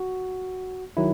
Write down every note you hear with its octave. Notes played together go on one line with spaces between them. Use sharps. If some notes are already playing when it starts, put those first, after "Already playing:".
Already playing: F#4
D#3 F#3 E4